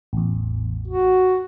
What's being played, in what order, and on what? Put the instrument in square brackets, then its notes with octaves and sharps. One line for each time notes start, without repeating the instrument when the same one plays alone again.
[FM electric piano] A1 E2
[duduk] F#4